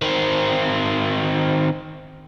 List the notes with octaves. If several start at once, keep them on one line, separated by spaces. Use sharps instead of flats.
D#3 C4